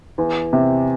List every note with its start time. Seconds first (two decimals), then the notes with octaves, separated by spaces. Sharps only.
0.18 E2
0.53 C3